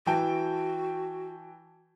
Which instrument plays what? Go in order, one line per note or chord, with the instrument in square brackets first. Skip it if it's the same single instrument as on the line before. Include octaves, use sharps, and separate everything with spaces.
[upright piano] E3 G5 A5 [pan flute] F#4